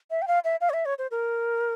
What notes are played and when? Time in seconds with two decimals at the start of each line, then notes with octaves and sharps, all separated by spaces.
0.11 E5
0.22 G5
0.28 F5
0.45 E5
0.61 F5
0.70 C#5
0.73 E5
0.85 C#5
0.99 C5
1.11 A#4